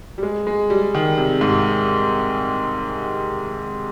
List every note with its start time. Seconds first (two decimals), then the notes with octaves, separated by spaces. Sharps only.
0.18 G3
0.23 G#3
0.47 G#3
0.70 G3
0.95 D#3
1.18 C3
1.41 G#2